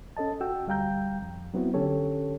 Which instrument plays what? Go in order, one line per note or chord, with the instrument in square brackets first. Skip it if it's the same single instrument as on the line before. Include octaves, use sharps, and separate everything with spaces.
[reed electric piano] C#4 A4 D#5 A5
F#4 G5 E6
D2 G3 F5 G5 A#5 G6
F2
F#3 B3 C4 E4 F#4
D3 C#4 G4 A4 C#5